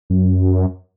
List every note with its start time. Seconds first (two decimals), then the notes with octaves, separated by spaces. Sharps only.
0.10 F#2